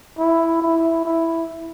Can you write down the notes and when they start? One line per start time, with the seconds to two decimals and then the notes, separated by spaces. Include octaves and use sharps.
0.19 E4
0.62 E4
1.05 E4